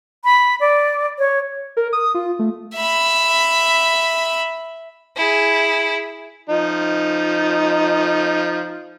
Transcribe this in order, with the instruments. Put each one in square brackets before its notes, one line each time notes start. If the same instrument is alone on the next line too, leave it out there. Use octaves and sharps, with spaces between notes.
[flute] B5
D5
C#5
[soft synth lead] A#4
D#6
F4
A3
[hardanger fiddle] E5 B5
[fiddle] E4 G#4
[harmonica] F3 D#4